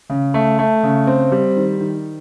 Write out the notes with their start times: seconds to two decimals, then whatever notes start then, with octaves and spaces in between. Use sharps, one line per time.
0.10 C#3
0.34 A3
0.59 A3
0.83 C#3
1.07 C4
1.32 G3
1.56 D#3
1.80 D#3